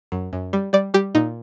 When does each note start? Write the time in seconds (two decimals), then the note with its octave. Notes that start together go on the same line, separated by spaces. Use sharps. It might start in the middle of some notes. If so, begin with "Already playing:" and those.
0.12 F#2
0.33 F#2
0.53 G3
0.73 G3 D5
0.94 G3 G4
1.15 A#2 D#4